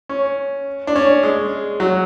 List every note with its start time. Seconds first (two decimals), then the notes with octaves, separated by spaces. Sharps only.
0.09 C#4
0.87 D4
0.96 C#4
1.23 G#3
1.80 F#3